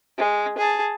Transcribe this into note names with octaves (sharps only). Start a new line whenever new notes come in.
G#3
G#4 A5